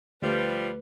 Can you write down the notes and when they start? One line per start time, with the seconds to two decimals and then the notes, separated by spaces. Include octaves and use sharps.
0.22 D2 F3 G3 A3 B4